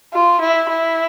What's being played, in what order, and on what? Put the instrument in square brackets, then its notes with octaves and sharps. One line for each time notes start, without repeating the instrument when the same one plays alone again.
[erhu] F4
E4
E4